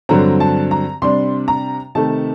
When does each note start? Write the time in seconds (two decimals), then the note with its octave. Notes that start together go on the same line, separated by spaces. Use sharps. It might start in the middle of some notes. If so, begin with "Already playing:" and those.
0.09 G2 D3 F#3 C4 A#5
0.40 A5
0.71 A#5
1.02 C3 G3 D4 C6
1.48 A#5
1.95 C3 D#3 A3 A5